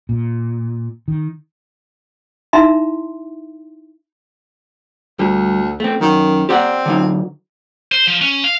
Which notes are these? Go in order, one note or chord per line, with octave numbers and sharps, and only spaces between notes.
A#2
D#3
D#4 E4 E5 A#5 C6
D2 G3
A3 C4
F#2 D#3
C4 G4 D5 F#5
D3 F#3 D#4
C5
F3
C#4
F5